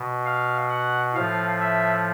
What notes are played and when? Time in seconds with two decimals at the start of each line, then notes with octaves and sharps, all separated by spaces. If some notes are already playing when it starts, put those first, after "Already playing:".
Already playing: B2
0.26 F5
0.70 F#5
1.14 A2 F3 F5
1.60 E5